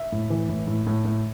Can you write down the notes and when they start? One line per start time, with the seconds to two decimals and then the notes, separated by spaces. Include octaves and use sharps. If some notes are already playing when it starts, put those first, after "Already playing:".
Already playing: E5
0.12 A2
0.30 E3
0.49 A2
0.67 A2
0.87 A2
1.05 A2